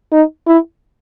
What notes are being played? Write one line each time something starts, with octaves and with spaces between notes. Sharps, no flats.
D#4
E4